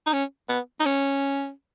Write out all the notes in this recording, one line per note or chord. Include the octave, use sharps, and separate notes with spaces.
D#4
C#4
B3
D#4
C#4